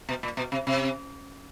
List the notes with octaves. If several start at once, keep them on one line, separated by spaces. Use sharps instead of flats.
B2
A#2
B2
C3
C3